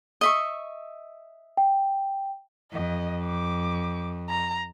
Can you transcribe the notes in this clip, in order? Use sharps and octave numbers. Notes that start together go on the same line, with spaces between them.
D#5 E5 C#6
G5
F2 D#5
D6
A#5